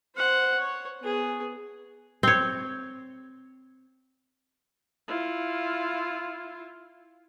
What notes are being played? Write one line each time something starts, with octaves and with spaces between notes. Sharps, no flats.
C5 F#5
C#5
B3 G#4
C4 C#5
E4 F4